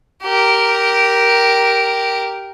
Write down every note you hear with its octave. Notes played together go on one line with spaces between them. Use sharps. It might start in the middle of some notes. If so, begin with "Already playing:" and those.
G4 A#4